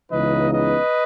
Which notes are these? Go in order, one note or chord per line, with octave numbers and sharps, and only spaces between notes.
C#2 C#3 E3 B3 D#4 B4 D#5
B4 D#5